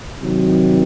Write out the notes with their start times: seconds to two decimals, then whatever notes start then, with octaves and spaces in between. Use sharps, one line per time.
0.19 C3 D#3 F#3